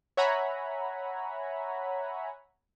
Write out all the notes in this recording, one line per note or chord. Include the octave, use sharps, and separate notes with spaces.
C#5 E5 F#5 G#5 A#5 B5